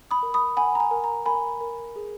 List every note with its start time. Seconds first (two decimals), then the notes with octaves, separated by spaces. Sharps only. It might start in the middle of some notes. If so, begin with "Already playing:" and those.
0.11 B5 D#6
0.23 A#4
0.34 B5 D#6
0.57 F#5 G#5 B5
0.75 A#5
0.80 G#5
0.91 A#4
1.04 A#5
1.26 A#4 G#5 B5
1.61 A#4
1.96 G#4